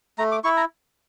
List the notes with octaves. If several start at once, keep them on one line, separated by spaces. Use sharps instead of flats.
A3 A#5
D6
E4 C#6
A#5